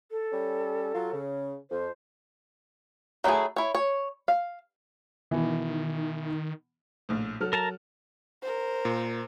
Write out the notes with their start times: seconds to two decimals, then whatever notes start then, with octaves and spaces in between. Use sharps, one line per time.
0.11 A4
0.32 G3 C#4
0.94 F#3 F4
1.13 C#3
1.70 F2 C5
3.24 F#3 A3 D4 E4 G#4
3.56 E4 C#5
3.75 C#5
4.28 F5
5.31 B2 D#3 E3
7.09 A#1 A2
7.41 F#3 A4 F6
7.53 A#4 A5 A#5
8.42 A#4 C5
8.85 A#2